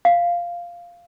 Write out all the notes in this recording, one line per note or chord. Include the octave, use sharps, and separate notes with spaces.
F5